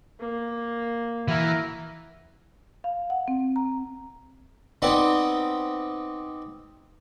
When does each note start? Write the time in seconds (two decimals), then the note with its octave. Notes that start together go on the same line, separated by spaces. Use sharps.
0.20 A#3
1.28 E3 E4 F#4 A#4
2.84 F5
3.10 F#5
3.28 C4
3.56 A#5
4.82 B3 C4 D#4 D5